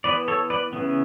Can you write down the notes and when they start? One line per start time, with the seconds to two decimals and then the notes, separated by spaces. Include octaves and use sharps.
0.04 E3 B3 B4 D5
0.28 A4 C#5
0.50 B4 D5
0.73 C#3 E3 B3